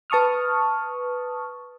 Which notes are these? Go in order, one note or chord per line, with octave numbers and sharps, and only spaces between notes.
B4 A5 C#6 D#6 F6